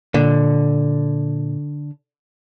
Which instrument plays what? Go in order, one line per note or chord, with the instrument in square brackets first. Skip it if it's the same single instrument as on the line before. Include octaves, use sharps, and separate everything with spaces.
[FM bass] A#2 [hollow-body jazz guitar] D3